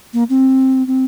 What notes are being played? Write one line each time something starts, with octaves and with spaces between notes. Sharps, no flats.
A#3
C4
C4